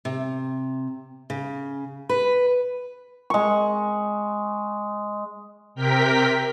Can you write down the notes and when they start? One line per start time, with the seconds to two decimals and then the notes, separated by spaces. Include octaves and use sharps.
0.05 C3
1.30 C#3
2.09 B4
3.30 G#3 C#6
5.75 C3 A#4 G5 B6